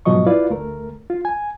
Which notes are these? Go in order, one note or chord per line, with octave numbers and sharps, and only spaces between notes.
G#2 B2 F3 F#3 D#5 C#6
E4 F4 B4 D5 F5
D2 A3 A#4
F4
G#5